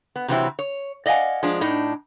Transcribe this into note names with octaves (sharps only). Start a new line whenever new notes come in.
B3
C3 E3 F#3 A3 C4 E4
C#5
D5 D#5 F5 F#5 G#5
F3 G#3 D4
A2 D4 D#4